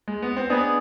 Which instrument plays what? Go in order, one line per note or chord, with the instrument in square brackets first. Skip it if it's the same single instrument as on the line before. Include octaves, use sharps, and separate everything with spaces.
[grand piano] G#3
B3
C4
[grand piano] B3 D4 [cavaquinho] G#4 B4 D#5